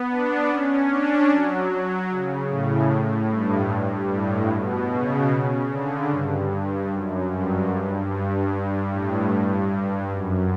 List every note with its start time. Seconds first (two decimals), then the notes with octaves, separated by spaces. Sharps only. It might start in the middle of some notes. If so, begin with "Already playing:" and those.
Already playing: B3
0.09 D4
0.49 C#4
0.90 D4
1.30 F#3
2.10 C#3
2.50 A2
3.30 G2
4.10 A2
4.51 B2
4.91 C#3
5.30 C#3
5.70 D3
6.10 G2
6.51 G2
6.91 F#2
7.31 G2
8.11 G2
8.50 G2
8.90 A2
9.31 G2
10.11 F#2